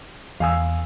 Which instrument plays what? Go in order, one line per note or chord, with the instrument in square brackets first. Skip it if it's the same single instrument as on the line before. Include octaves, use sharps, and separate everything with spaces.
[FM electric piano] E2 [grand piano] F5 G#5 E6